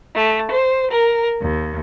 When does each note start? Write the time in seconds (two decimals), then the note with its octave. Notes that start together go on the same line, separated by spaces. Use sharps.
0.14 A3
0.51 C5
0.90 A#4
1.41 D#2